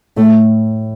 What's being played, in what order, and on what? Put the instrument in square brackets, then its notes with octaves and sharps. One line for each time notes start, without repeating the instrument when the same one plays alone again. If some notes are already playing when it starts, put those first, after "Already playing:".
[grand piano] A2 [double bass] A3